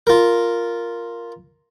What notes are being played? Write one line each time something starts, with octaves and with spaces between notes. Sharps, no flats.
F4 A#4